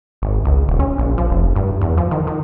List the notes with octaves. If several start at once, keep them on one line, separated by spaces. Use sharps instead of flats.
G#1
C#2
D#1
C#4
A#1
F3
F1
G2
E2
F3
D#3
D#3